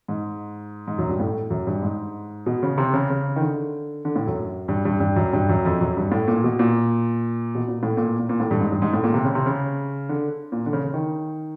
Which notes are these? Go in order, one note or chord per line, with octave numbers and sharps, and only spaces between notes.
G#2
G#2
F#2
G2
A2
F#2
G2
G#2
B2
C#3
C3
C#3
C#3
D#3
D3
D3
A2
F#2
G2
G2
G2
F#2
G2
F#2
F2
F#2
G2
A2
A#2
B2
A#2
B2
A#2
A2
A#2
A#2
A#2
A2
G2
G#2
G2
G#2
A2
A#2
C3
C#3
C3
C#3
D3
A#2
D3
C#3
C#3
D#3